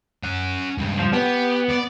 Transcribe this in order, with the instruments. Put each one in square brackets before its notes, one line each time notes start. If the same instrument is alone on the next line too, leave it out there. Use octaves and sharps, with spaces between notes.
[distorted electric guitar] C#4 F#5
C#2 G2
[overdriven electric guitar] F3
[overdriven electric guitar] B3 [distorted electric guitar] G4
[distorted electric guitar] D5